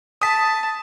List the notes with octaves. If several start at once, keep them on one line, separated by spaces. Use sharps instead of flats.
A5 D#6 B6